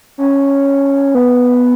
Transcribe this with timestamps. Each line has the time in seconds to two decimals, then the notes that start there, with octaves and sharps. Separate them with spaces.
0.18 C#4
1.15 B3